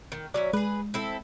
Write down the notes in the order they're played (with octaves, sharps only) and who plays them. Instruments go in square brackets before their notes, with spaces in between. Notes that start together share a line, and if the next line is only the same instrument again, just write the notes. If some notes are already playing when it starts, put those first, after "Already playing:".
[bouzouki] D#3
[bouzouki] F#3 C#4 E4 [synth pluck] D5
[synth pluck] G#3 [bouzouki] G#4 B4
[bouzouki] C4 E4 A4